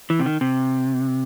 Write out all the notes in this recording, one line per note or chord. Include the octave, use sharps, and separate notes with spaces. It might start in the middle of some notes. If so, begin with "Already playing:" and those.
E3
C3
D#3
C3